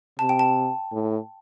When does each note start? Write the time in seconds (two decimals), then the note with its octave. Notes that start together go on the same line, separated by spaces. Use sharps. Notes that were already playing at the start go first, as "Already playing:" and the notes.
0.19 C3 A5
0.29 G5
0.39 A5
0.92 A2